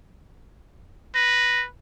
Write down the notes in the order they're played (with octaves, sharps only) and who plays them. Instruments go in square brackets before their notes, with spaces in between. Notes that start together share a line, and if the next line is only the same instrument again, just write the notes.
[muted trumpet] B4 [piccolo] A#6